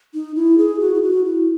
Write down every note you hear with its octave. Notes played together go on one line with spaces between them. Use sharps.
D#4
E4
G#4
F#4
E4
F#4
E4